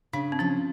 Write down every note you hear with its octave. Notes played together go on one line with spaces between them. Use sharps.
C#3 D4
C4
F3 C#4